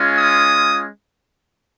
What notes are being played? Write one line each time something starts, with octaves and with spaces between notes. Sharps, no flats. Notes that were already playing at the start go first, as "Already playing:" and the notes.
Already playing: G#3 C#4 F4
D#6